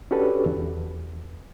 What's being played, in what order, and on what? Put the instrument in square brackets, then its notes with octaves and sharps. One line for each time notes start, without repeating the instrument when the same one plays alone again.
[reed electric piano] C#4 D4 F#4 G4 A4 B4
E2